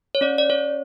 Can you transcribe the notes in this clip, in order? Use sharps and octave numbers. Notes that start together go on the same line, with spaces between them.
C#5
C#4 D5
D5
C#4 C#5